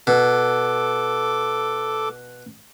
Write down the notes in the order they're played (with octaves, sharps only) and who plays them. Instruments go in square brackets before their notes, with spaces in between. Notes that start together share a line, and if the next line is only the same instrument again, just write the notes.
[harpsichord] B2 [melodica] A4 D6